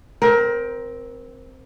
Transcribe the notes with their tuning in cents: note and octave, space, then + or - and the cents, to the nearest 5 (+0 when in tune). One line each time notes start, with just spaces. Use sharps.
C4 +0 A#4 +20